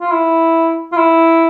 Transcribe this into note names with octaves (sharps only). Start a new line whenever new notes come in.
F4
E4
F4
E4